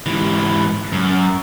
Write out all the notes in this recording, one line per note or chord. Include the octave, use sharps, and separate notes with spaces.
G#2 E3
F#2